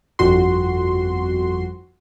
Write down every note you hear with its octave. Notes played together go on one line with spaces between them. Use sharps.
G1 F2 F#4 C6